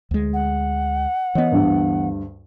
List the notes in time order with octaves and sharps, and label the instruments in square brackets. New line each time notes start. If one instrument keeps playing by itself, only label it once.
[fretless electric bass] D2 G#3
[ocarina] F#5
[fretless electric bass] E3 B3 [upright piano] C#5 D#5
[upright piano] D2 G2